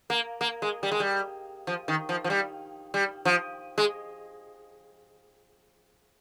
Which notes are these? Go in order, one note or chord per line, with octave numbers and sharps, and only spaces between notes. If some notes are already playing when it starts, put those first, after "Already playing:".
A#3
A#3
G#3
G3
G#3
G3
F3
D#3
F3
F3
G3
G3
F3
G#3